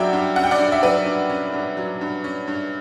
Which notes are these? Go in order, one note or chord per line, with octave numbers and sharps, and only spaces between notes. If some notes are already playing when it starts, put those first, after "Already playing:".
Already playing: G2 F#3 D5 E5 F#5 G5
G2
C#4 F#5
G5
D5 F#5
G2
E5
F#3 B4 D5
G2
C#4
G2
F#3
G2
C#4
G2